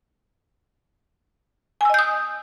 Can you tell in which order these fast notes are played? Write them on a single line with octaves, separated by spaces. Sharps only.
G#5 E6 D#5 G6 D#6